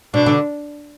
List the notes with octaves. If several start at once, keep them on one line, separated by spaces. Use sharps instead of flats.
B2 D4
D3